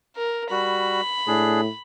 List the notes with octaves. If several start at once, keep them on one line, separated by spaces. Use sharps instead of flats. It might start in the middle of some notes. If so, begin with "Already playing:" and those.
A#4
G3 F#4 B5
A2 D4 G#4